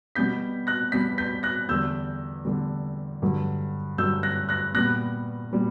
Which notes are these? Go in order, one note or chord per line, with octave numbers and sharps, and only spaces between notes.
B2 G3 B3 G6 B6
F#6 A#6
B2 G3 B3 G6 B6
G6 B6
F#6 A#6
E2 D3 G3 E6 G6
E2 D3 G3
G2 D3 F#3
G2 D3 F#3 E6 G6
F#6 A#6
F#6 A#6
A#2 G3 B3 F#6 A#6
A#2 G3 B3